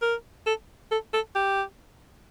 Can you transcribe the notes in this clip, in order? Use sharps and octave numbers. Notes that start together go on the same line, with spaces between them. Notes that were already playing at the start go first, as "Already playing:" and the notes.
A#4
A4
A4
A4
G4